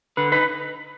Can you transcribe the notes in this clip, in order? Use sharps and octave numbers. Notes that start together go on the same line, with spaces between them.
D3 B4
D#4 B4